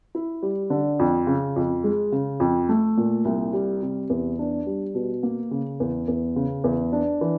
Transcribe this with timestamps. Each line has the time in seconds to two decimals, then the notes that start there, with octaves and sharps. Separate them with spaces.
0.15 E4
0.43 G3
0.70 D3
0.99 F2
1.27 C#3
1.56 F2
1.84 G#3
2.12 C#3
2.40 F2
2.69 A3
2.97 A#2
3.25 C2
3.53 G3
3.82 C3
4.10 E2
4.39 D4
4.66 G3
4.95 B2
5.23 A#3
5.51 C#3
5.80 E2
6.08 E2
6.36 C#3
6.64 E2
6.93 D4
7.21 E3